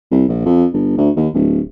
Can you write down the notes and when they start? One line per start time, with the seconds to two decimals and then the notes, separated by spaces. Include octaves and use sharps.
0.11 C2
0.29 A#1
0.45 F2
0.74 G1
0.98 D2
1.17 D#2
1.34 D1